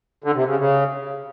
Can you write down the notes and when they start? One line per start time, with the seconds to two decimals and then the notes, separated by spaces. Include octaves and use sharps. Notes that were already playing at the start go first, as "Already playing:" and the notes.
0.24 D3
0.35 C3
0.46 C#3
0.58 C#3